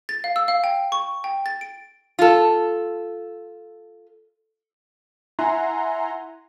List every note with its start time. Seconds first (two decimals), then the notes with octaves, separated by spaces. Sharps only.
0.09 A6
0.24 F5
0.36 E6
0.48 F5
0.64 G5
0.92 C#6
1.24 G5
1.46 A6
1.61 D7
2.19 F4 A4
5.39 E4 E5 F#5 G#5 A#5 C6